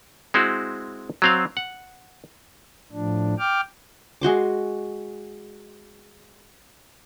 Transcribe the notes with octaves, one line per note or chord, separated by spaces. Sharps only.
G#3 C4 E4 F#4
F#3 C4 F5
F#5
A2 F3 D4
G5 D6 F6
G#3 F#4 C6 D6